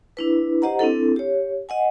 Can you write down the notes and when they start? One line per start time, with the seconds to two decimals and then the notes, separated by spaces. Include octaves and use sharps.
0.17 D4 E4 B4
0.62 G4 C5 D#5 F#5 A#5
0.79 C4 D4 E4 A4
1.16 G4 C#5
1.69 D#5 F#5 G#5